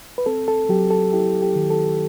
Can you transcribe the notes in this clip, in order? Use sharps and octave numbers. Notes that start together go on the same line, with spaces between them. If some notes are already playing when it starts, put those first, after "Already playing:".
B4
C4 A4
A4
F#3 G4
A4
E4 G4
G4
D#3
A4